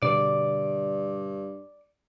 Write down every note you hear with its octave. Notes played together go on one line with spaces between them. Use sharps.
G2 B2 D3 D5